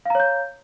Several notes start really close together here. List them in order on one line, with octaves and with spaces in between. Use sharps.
F5 A#5 C#5 G6